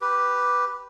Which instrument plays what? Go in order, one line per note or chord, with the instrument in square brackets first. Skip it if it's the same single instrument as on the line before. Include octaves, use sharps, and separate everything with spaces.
[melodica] G4 B4